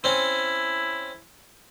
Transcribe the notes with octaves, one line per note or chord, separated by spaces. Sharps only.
C4 C#4 E4